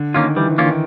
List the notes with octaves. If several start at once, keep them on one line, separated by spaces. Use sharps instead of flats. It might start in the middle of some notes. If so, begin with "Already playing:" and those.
Already playing: D3
D#3 A#3 C#4 F4
E3 G3
E3
A#3 C#4 F4
D#3